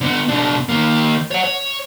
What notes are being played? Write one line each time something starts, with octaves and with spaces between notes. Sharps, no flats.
D3 B3
B2 D4
D#3 A#3
C#5 F#5
C#5